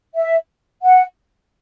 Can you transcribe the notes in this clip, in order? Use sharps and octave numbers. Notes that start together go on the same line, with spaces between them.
E5
F#5